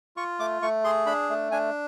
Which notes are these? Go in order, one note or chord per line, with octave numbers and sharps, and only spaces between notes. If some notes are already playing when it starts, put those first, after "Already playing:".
F4 C#6
A3 D6
A3 C#6
G#4 C6
D4 B5
A3
D4 G#5